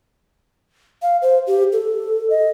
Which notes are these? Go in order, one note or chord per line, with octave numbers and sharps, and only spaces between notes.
F5
C5
G4
A4
D#5